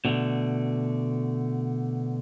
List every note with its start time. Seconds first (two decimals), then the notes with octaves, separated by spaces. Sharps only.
0.05 B2 D3 A3